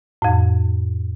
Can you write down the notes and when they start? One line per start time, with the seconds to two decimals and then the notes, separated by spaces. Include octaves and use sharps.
0.22 F2 A2